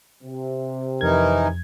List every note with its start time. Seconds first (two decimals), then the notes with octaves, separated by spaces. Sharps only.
0.23 C3
1.01 F2 E3 D#4 A#4 G#6